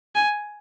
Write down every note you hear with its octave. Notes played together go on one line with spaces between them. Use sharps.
G#5